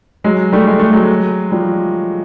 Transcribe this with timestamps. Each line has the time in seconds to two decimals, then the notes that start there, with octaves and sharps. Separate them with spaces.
0.24 F#3 G#3
0.53 G3 A3
0.67 G#3
0.79 A3
0.93 F#3 G#3
1.52 F3 G3